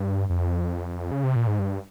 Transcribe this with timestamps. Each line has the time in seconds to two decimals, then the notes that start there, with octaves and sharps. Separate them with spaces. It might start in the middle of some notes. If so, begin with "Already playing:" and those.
Already playing: G2
0.30 F2
1.12 C#3
1.24 C3
1.36 A#2
1.47 G#2
1.59 G2